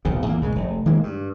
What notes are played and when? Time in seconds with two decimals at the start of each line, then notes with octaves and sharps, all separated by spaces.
0.05 D1 B1 C#3
0.26 E2 A#3
0.41 A#1 C#3 G#3
0.56 F1
0.86 D#3 G#3 A#3
1.03 G2